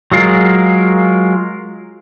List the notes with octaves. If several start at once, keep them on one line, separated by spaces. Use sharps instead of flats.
F#3 G#3 F4 G#4 A#4